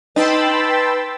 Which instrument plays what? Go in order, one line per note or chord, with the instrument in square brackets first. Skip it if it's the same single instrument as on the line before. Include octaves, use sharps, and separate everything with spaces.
[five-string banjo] D#4 [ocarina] B4 [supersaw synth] G5 C6 E6 [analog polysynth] A5 B5 A6